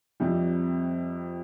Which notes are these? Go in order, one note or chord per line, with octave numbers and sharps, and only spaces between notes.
F2 C3 G3